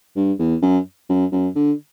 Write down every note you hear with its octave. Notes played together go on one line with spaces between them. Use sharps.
G2
E2
F#2
F#2
F#2
D3